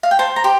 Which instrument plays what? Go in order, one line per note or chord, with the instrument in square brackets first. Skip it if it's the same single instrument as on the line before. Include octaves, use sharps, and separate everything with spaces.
[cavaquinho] F5
G5
C5 A5
A#5
G4 C6